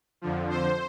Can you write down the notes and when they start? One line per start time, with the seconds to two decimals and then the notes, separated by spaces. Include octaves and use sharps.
0.21 F2 D3 F3
0.50 C5